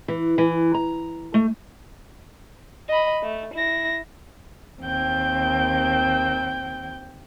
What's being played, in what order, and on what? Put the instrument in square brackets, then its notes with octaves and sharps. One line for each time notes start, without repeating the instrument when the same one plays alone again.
[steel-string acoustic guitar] E3
E3
A#5
A3
[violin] D#5 B5
A3
E4 A#6
[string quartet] D#2 C4 G5 G6